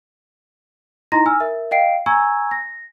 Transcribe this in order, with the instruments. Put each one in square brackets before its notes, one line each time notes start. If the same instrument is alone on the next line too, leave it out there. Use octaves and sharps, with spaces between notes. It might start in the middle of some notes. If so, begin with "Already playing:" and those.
[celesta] D#4 E4 D#5 A#5 C6 A#6
G#5 E6 F6
A#4 E5
D#5 F5 G5 C7 D7
G#5 A#5 C#6 E6 G#6
A#6